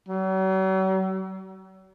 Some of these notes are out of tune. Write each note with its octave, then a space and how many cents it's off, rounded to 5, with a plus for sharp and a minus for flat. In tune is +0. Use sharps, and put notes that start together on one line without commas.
F#3 +45